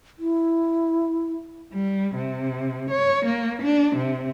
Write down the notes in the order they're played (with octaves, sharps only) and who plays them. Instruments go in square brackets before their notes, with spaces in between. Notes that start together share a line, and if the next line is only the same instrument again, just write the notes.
[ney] E4
[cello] G3
C3
C#5
A#3
D4
C3